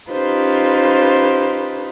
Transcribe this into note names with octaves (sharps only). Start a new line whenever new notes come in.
C#4 D#4 F4 G4 B4 C5